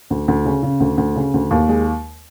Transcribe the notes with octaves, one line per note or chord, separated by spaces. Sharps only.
D2
D2
C#3
C#3
D2
D2
C#3
D2
D#2
G#3